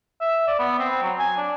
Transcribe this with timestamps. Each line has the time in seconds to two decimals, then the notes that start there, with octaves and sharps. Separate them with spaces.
0.21 E5
0.47 D5
0.59 B3
0.79 C4
1.02 F#3
1.19 G#5
1.37 D4